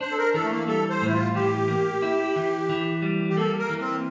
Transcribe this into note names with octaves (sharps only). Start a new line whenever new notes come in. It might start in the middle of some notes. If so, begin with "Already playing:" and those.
D4 C5
A4
A#4
E3 A4
A3
A#3
G3 A4
C5
A2
E4
F4
E3 G4
A#3
E4
E3
E3
G3
G4
A#3 A4
A#4
E3
C4